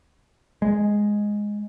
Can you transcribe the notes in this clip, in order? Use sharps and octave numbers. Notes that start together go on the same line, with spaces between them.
G#3